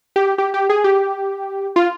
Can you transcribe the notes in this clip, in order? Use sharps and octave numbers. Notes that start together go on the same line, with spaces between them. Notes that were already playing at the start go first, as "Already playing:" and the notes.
G4
G4
G4
G#4
G4
F4